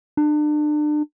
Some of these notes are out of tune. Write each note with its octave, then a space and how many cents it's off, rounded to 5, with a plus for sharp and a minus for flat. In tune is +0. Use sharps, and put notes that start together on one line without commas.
D4 +35